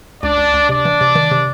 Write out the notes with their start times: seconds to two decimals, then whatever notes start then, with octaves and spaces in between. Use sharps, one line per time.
0.22 C#2 D4 D5
0.38 C#2
0.54 C#2
0.69 C3 D4 D5
0.85 E3
1.01 C3
1.15 D#3
1.31 C3